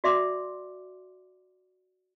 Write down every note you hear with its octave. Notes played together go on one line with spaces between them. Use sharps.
F#4 D5 E5 F#5 C6 D6